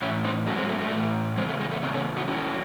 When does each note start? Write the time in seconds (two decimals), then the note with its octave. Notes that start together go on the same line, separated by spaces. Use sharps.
0.02 A2 E3 C#4 E4
0.24 C4 D#4
0.47 G#2 F#3 A3 C#4
0.58 G#3 C4
0.69 A3
0.81 A3
0.92 A2 E3
1.37 E2 C#3 G#3 C4
1.49 A3
1.60 G#3
1.71 A3
1.83 E2 C#3 C4 D#4
1.94 A3 C#4
2.17 D#4 F#4
2.28 F#2 D#3 F#3 C#4 E4